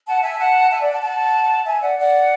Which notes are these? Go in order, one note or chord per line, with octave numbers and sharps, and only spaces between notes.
F#5 A5
E5 G#5
F#5 A5
E5 G#5
D5 F#5
F#5 A5
F#5 A5
E5 G#5
D5 F#5
D5 F#5